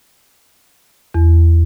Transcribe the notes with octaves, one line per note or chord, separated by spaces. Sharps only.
E2